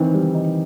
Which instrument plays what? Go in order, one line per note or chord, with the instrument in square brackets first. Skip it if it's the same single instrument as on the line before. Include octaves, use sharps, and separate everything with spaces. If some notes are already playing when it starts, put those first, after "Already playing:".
Already playing: [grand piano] D#3 C4 [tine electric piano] E3
[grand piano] G3
D#4